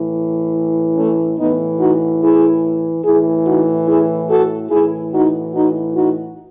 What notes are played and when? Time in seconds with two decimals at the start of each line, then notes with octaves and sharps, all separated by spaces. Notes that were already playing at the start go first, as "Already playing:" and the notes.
Already playing: A2 E3
0.96 A3 C#4
1.37 A2 E3 B3 D#4
1.79 D#4 F#4
2.21 E4 G#4
3.03 A2 E3 E4 G#4
3.45 D#4 F#4
3.87 E4 G#4
4.29 F#4 A4
4.70 A2 E3 E4 G#4
5.12 D#4 F#4
5.53 D#4 F#4
5.95 D#4 F#4